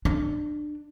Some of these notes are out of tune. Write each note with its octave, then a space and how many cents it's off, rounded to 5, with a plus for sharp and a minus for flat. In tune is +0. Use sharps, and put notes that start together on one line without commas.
D4 +25